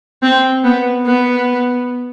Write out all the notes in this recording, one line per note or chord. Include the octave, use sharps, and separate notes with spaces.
C4
B3
B3